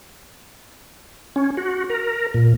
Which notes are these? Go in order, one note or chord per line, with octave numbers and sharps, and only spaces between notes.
C#4
F#4
A#4
A#2